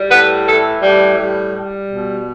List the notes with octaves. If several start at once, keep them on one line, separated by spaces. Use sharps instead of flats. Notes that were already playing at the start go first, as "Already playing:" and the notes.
Already playing: G3
A2 B4
E3 A4
A2 G3
G3
G3
B2